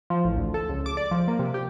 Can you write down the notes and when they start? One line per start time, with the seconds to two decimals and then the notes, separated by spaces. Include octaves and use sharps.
0.10 F3
0.24 A1
0.36 D2
0.54 A4
0.69 C#2
0.86 D6
0.97 D5
1.11 F3
1.28 A#3
1.39 C3
1.54 G4